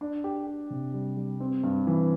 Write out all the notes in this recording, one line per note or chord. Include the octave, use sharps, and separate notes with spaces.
D4
G4
G4
C3
G3
G3
C4
G2
E3